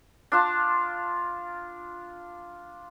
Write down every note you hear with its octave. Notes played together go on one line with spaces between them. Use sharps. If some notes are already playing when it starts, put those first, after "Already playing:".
D4 F4 A5